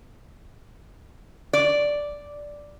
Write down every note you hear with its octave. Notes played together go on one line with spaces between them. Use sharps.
D5